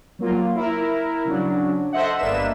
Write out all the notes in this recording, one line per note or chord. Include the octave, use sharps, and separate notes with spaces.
F#3 A#3 F4
E4 A#4
C#3 F#3 D4
A4 C5 D#5 E5 F#5
G1 A#3 D4 B4 E5 E7